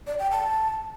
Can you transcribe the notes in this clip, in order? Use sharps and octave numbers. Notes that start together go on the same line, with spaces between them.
D5
G5
A5